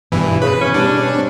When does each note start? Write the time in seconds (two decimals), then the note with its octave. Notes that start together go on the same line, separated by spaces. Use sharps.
0.12 G2 B2 E3
0.42 C#3 B4
0.61 C3 E3 C#4
0.74 B2 G3 D4 G4
1.14 G2 C4